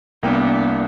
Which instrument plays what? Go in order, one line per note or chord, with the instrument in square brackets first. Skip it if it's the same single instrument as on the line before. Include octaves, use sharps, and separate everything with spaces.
[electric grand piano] C2 A#3 G5 [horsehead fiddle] B3 D4